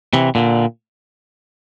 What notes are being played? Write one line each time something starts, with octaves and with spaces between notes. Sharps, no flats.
C3 E3
A#2 D3